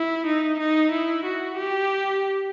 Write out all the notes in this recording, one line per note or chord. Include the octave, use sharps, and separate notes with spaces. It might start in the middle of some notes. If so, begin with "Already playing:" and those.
Already playing: E4
D#4
D#4
E4
F#4
G4